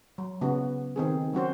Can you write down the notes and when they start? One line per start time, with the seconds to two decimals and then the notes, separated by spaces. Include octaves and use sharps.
0.18 F#3
0.41 C#3 B3 F#4
0.96 D#3 C4 G#4
1.33 F#3 C#4 F#4 C5